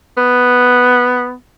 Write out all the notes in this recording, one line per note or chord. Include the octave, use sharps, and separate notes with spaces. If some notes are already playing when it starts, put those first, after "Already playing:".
B3